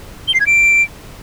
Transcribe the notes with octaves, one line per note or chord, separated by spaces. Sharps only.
G7
C7
G#6
D7